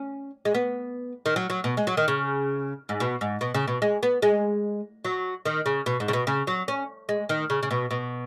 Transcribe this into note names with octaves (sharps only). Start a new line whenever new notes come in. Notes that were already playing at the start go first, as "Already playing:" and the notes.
Already playing: C#4
G#3
B3
D#3
F#3
F#3
B2
G#3
F#3
D#3
C#3
G#2
B2
G#2
B2
C#3
B2
G#3
B3
G#3
F#3
D#3
C#3
B2
G#2
C#3
B2
C#3
F#3
C#4
G#3
D#3
C#3
C#3
B2
B2